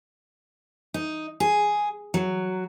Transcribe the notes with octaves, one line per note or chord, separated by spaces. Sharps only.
D#4
G#4
F#3